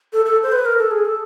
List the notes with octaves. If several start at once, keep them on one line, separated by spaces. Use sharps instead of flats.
A4
A4
C5
B4
A#4
A4
G#4
A4